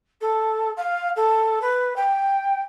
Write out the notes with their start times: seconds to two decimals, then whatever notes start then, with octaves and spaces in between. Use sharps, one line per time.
0.21 A4
0.77 F5
1.16 A4
1.62 B4
1.96 G5